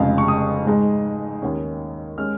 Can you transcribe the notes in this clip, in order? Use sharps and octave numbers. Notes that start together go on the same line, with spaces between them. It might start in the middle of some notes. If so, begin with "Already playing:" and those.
Already playing: F1 F2 C#3 G#3 F5
C#6
D#6
G#2 G#3 D#4
D#2 D#3 C#4
G#3 C#4 F6